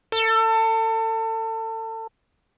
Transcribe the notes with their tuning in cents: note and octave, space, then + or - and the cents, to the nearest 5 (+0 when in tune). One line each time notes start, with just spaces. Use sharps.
A4 +30